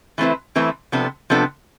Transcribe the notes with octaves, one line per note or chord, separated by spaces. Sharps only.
E3 A3 C4 E4 B4
E3 A3 C4 E4 B4
C3 F3 B3 D4 A4
C3 F3 B3 D4 A4